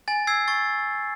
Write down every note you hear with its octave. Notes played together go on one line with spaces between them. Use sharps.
G#5 A6
E6 G#6 C7
C#6 A6